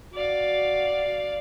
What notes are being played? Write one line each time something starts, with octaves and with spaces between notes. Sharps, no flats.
F#4 D5 F5